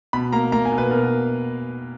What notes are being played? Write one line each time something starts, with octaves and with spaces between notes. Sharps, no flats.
B2 B5
A#3 A#5
A#3 A#5
G#5
B2
B4
B2 A#4